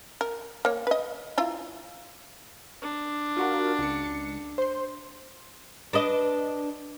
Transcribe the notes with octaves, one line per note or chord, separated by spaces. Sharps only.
A#4
A#3 C#5
B4 D#5
E4 F4 A#5
D4
F4 F#4 A#4
C#2 C#7
C5 C6
D4 B4 D#5